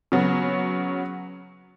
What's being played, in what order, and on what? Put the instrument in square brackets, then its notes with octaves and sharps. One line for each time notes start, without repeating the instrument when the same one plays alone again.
[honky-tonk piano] C#3 F#3 B3